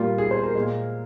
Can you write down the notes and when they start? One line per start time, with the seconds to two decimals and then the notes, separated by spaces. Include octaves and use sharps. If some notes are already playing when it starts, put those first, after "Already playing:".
Already playing: A#2 G3 A#3 F4
0.18 G#4
0.31 C5
0.43 A#4
0.55 G#3
0.60 A#2